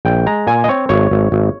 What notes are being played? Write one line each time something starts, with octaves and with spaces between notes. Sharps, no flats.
A#1 G5
G#3 A#5
A#2 G#5
D#5
C4 C#5
G#1 C#5
G#1
G#1